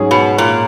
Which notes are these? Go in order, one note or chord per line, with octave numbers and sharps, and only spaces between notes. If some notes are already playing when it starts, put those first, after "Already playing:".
Already playing: G#2 F#3 C#4 G#4
B2
A#2